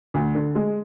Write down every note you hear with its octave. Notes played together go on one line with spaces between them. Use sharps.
D2
D3
G#3